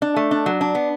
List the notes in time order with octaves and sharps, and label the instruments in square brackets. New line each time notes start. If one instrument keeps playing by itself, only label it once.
[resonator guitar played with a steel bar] D4
A3
D4
F#3
D4
B3